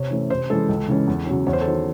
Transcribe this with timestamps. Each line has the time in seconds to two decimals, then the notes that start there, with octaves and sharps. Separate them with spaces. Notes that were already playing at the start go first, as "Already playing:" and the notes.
Already playing: C3 C#5
0.11 E3 A3 C#4
0.30 C3 C5
0.50 E3 G#3 C#4 A4
0.69 C#2
0.88 C#3 E3 G#3 C#4
1.07 E2
1.26 C#3 F#3 C#4
1.47 E2 C#5
1.53 C5
1.61 A4
1.65 D#3 F#3 C5